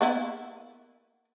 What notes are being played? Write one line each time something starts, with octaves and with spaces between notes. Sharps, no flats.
A#3 B3 E4